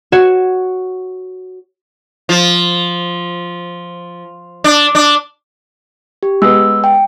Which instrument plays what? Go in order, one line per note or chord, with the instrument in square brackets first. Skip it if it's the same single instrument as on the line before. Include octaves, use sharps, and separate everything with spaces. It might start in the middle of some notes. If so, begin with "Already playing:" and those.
[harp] F#4 C#5 E7
[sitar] F3
D4
D4
[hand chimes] G4
[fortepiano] G#3 B3 [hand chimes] E6
[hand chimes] G5